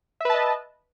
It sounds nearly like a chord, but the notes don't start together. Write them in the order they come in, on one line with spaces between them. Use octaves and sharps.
E5 B4 A5 D#5